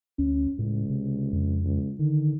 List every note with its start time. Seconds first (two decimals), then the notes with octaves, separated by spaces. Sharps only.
0.19 D2 C#4
0.59 C#2 A2
0.90 C3
1.33 F2
1.64 C#2
1.99 D3 D#3